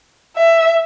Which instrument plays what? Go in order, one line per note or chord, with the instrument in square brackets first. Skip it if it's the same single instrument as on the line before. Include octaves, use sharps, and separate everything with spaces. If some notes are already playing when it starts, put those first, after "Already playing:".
[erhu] E5